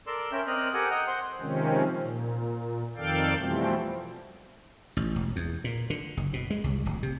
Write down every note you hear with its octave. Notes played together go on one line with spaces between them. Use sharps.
A4 A#4 D5 C6 E6
C#4 A#4 E5 G5
C4 A#4 D5 D#5 F6 F#6
G4 A4 A#4 F#5 G#5
D#5 F#5 G5 A#5
C5 F#5 C6
C3 D#3 F3 G#3 C4 C#4
A#2
F2 D#3 A4 D5 F5 G5
B2 E3 F3 G3 A3 C4
A1
E1
E2
A#2
D3
F#1
B2
G#3
C2
D1
C3